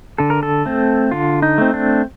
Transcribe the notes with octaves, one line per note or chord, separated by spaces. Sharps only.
D3 A4
A#4
A4
A3 C4
D3 F4
D#4
A3 C4
D4